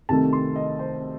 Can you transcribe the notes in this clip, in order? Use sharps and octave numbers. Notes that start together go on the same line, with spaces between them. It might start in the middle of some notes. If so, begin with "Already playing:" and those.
C2 C3 D#3 A3 A5
C6
D#5
C5